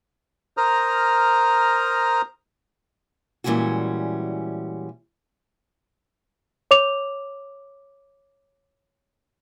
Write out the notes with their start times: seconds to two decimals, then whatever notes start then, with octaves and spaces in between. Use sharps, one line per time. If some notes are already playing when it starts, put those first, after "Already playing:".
0.57 A#4 C5 A#5 D#6 F6
3.44 A#2 E3 G3 G#3 C#4 F#4
6.71 C#5 D6 F7